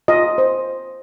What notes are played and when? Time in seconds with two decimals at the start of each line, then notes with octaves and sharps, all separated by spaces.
0.08 F4 D#5
0.38 C5